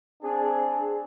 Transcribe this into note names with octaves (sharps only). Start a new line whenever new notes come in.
C4 D4 G#4